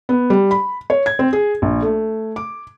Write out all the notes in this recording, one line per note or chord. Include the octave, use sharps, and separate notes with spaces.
B3
G3
B5
C#5
G#6
C4
G#4
A#1
A3
D6